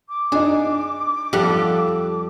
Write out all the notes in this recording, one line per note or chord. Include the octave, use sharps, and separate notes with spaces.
D6
D4 D#4 G#4
F2 G3 G4 A4 F#5